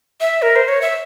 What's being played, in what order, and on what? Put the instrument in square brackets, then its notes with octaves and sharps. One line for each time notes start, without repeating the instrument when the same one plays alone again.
[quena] E5
A#4
C5
C#5
E5